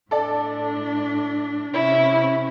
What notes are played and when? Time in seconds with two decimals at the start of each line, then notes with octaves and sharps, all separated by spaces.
0.11 A2 D4 A4 D5
1.73 C3 C#4 E4